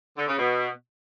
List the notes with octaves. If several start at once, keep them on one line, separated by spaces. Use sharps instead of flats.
D3
C#3
B2